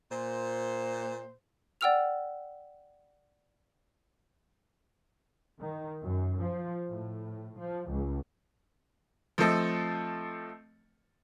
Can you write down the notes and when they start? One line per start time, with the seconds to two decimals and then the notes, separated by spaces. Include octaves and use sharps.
0.10 A#2 C5
1.81 D5 F#5 G5 E6 F6 F7
5.60 D#3
6.02 F#2
6.39 F3
6.91 A2
7.60 F3
7.91 C#2
9.38 F3 A3 C4 A4 D#5